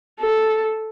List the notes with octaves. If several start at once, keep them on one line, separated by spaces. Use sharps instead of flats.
A4